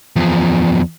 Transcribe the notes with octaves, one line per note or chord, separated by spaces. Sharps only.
E2 F3